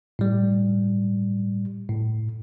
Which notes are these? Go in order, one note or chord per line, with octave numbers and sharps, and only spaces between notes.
A2 G3
A2